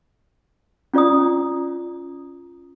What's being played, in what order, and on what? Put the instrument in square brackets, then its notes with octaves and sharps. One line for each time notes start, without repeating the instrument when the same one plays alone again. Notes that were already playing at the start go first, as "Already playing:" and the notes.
[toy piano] C#4 F4 D5 A#5 D#6